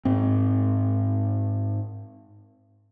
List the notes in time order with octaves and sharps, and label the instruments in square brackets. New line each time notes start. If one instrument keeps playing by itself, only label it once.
[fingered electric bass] G#2 C4